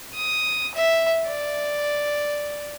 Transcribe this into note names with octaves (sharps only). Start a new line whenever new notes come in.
D#6
E5
D5